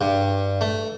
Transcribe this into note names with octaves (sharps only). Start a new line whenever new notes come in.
G2
A3